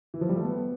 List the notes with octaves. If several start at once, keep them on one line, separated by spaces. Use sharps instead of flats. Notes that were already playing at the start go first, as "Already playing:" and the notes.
E3
F3
G3
A3
B3